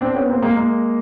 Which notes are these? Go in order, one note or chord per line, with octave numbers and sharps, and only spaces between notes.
C4 D4
B3 C#4
A#3 C4
G#3 A#3
G#3 A#3